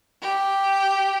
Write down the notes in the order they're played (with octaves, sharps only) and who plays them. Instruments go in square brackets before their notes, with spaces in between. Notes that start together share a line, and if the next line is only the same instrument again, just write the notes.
[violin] G4